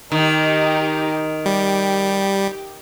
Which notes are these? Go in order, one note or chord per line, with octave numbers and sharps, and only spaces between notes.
D#3 D#4 G4
G3 G4